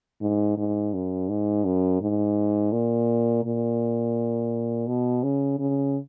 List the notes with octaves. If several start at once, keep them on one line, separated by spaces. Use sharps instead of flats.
G#2
G#2
F#2
G#2
F#2
G#2
A#2
A#2
B2
C#3
C#3